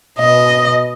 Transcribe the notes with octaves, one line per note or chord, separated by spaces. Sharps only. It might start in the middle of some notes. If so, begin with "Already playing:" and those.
B2 D#5